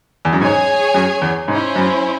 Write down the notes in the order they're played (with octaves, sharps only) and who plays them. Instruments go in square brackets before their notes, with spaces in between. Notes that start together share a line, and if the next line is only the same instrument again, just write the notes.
[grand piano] E2
F#2
[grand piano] G#2 [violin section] G#4 C#5 G#5
[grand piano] F#2
E2
[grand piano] G#2 [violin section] C#4 E4 C5
[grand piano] F#2